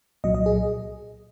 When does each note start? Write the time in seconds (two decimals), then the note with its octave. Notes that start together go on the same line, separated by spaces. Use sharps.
0.24 C2 A#2 F#3 D#5
0.35 D#5
0.46 G#4